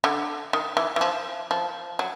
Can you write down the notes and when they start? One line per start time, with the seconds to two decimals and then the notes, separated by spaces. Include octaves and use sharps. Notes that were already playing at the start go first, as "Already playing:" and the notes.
0.04 D3
0.53 D#3
0.77 E3
0.96 E3
1.01 F3
1.51 F3
1.99 F#3